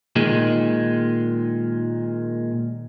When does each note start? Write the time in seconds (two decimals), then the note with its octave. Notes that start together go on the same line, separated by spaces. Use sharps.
0.16 A#2 D#3 G#3